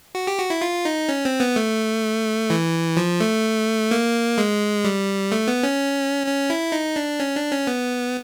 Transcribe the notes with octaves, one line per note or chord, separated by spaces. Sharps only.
F#4
G4
F#4
E4
F4
D#4
C#4
C4
B3
A3
E3
F3
A3
A#3
G#3
G3
A3
B3
C#4
C#4
E4
D#4
D4
C#4
D4
C#4
B3